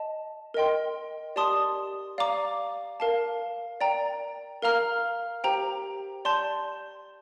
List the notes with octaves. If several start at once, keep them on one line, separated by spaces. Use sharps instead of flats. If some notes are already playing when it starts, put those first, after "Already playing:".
Already playing: D#5 A5
A#4 D#5 G5 C6
G4 D5 A5 C6 D#6
D5 F5 A#5 D6
A#4 F5 A5
D5 G5 A#5
A#4 F5 A#5 F6
G4 C5 G5 A#5
D5 A5 C6 G6